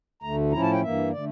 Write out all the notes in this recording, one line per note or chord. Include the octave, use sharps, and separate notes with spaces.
D2 D3 A3 A#5
A2 F3 C#4 E4 A#5
A5
G5
G2 E3 A#3 E5
D3 A3 D5